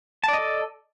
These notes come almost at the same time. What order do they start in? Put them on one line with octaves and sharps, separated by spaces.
A5 D5 D#5 A4